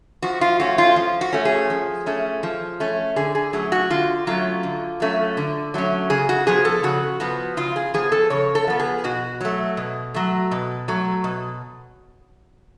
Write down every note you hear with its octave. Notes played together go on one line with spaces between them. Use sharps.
F3 F#4
F4
A3 C#4 F#4
F4
F3
F#4
A3 C#4
G#4
F3
A3 C#4
F3
A3 C#4
D3 G#4
G#4
F#3 A3 C#4 G#4
F#4
D3 F4
F#3 A3 C#4 F4
D3
F#3 A3 C#4
D3
F#3 A3 C#4
C#3 G#4
F#4
F3 B3 G#4
A4
C#3 F#4
F3 B3 F#4
C#3 F4
G#4
F3 B3 G#4
A4
C#3 C#5
A4
F3 B3
G#4
B2 F#4
F#3 A3
B2
F#3 A3
B2
F#3 A3
B2